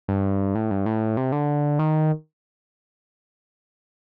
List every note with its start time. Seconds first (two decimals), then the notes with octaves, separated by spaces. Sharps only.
0.08 G2
0.55 A2
0.71 G2
0.86 A2
1.17 C3
1.32 D3
1.79 D#3